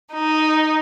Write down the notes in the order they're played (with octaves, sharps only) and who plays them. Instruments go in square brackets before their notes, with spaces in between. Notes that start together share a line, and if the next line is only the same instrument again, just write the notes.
[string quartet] D#4